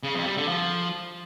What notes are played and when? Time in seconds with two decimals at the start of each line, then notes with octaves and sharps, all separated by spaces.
0.03 C#3
0.15 F2
0.26 G3
0.37 D3
0.48 F3